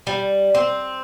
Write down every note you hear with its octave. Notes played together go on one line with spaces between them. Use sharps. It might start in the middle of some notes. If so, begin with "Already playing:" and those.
G3
C4